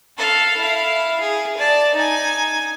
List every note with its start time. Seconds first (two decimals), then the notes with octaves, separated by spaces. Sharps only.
0.18 A4 F5
0.57 E4 F5
1.20 G#4
1.57 D5 A5
1.95 D#4 G#5